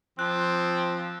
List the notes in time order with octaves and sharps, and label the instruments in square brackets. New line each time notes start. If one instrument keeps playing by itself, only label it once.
[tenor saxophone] F3 [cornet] C4 [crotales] F#6